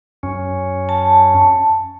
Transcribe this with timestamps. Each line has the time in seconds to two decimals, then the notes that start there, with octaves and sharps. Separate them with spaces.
0.23 F#2 C#4
0.89 A5